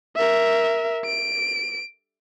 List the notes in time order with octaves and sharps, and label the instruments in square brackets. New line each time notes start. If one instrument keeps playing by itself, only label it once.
[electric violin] A#4 E5
D7